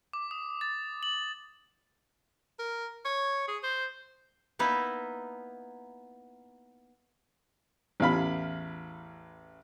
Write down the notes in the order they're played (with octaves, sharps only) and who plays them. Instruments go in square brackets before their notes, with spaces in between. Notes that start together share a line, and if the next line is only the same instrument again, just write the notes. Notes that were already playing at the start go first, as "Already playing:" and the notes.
[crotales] D6
D#6
A6
F#7
[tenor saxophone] A#4
C#5
G#4
C5
[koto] A#3 B3 D#4 E4
[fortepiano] A1 E2 F5 B5